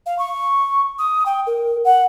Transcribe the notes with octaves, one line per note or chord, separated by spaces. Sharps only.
F5
C#6
D#6
G5
A#4
F#5